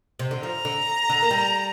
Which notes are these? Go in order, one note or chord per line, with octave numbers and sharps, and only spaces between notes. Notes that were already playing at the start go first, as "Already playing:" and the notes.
C3
D3
F3 A#5
D3
D3
A#3
G3